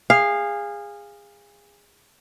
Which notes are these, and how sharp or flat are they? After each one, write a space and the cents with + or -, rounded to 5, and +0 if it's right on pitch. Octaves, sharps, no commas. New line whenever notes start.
G#4 -25 F5 +0